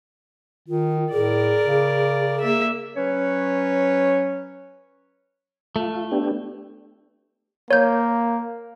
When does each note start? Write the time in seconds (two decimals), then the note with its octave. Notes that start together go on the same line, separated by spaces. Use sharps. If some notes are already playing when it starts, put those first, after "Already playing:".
0.68 D#3 F4
1.13 A2 G#4 A#4 D5
1.66 C#3
2.40 A#3 E5
2.96 F#3 C#4 B4 C#5
5.76 A3 F4
6.11 B3 D4 G4
7.71 A#3 C#5 G6